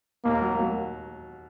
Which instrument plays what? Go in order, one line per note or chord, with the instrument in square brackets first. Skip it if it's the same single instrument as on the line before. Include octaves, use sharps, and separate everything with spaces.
[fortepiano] D#2 [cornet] A#3
[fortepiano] F#3
F#3